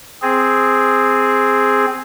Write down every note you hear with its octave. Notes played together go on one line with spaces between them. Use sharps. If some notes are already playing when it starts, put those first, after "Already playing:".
C4 G#4